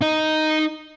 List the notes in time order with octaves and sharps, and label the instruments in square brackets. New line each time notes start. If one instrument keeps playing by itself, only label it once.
[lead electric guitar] D#4 D#5